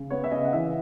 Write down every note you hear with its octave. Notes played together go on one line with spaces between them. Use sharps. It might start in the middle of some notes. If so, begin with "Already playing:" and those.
Already playing: C#3
B3 C#5
E5
C#3 D#5
F#5
E3 E5